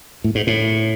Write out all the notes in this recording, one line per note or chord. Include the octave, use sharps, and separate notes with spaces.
A2
G#2
A2